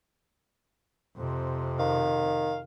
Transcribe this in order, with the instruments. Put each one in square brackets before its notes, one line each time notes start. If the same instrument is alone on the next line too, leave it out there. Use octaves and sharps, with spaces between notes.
[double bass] F2 C3
[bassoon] D#3 [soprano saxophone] F5